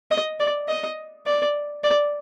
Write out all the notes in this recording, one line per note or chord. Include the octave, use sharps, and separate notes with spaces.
D#5
D5
D#5
D5
D5